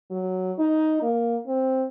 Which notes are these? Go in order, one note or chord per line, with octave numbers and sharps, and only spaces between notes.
F#3
D#4
A#3
C4